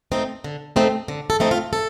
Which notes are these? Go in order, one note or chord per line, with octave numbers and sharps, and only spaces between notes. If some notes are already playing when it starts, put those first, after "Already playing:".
A3 C4 D#4
D3
A3 C4 D#4
D3
A4
A3 C4 D#4
F4
A4